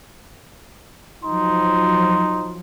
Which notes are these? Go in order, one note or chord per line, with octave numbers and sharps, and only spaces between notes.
F3 F#3 D#4 C6